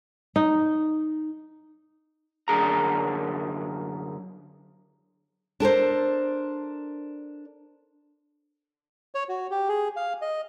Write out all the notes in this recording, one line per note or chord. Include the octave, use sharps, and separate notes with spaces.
D#4
F#2 D3 G#4 A#5
D4 A4 A#4 C5
C#5
F#4
G4
G#4
F5
D#5